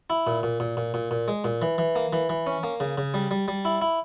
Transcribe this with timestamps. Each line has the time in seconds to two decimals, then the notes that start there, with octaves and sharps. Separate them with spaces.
0.10 E4
0.27 A#2
0.43 A#2
0.60 A#2
0.77 A#2
0.94 A#2
1.11 A#2
1.28 G#3
1.44 A#2
1.62 E3
1.78 E3
1.96 A#3
2.13 E3
2.30 E3
2.47 C#4
2.63 A#3
2.80 C#3
2.98 C#3
3.14 G3
3.31 G3
3.48 G3
3.65 E4
3.81 E4